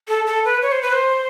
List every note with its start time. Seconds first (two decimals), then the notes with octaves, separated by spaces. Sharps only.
0.08 A4
0.27 A4
0.45 B4
0.62 C#5
0.72 C5
0.82 B4
0.92 C5